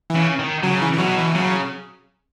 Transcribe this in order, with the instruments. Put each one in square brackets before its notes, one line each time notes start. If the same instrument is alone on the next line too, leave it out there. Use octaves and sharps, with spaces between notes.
[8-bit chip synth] E3
[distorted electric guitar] C#3
D#3
[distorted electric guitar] C#3 [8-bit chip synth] F#3
[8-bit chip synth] E3
E3
[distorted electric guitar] B2 [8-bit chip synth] F#3
[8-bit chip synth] E3
[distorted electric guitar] C#3 [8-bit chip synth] F#3